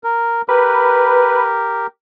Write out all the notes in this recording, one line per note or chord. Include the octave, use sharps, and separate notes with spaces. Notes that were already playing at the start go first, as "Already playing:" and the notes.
A#4
G4 A#4 B4